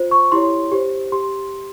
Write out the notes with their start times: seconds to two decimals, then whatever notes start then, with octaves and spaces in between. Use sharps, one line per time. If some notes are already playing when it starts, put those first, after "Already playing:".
Already playing: F4 C5
0.11 C#6
0.32 E4 G4 C#5 C6
0.72 G4 C5
1.12 G4 C6